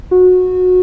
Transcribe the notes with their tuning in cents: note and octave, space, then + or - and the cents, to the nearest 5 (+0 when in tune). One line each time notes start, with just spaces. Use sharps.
F#4 -20